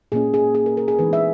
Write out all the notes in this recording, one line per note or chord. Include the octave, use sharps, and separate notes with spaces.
A#2 A#3 C#4 G#4
G#4
G#4
A#4
A#4
G#4
E3 G#3 B3 D#4 B4
E5